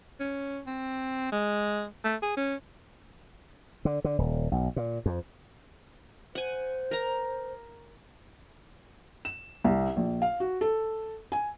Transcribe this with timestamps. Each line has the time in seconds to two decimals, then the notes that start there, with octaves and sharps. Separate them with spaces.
0.20 C#4
0.66 C4
1.32 G#3
2.04 A3
2.22 G#4
2.37 C#4
3.85 D3
4.04 D3
4.18 D#1
4.52 B1
4.76 A#2
5.06 F2
6.35 C5 F#5 G#5
6.91 A#4 A#5
9.25 E7
9.64 C2
9.96 A#1
10.22 F5
10.40 F#4
10.61 A4
11.32 G#5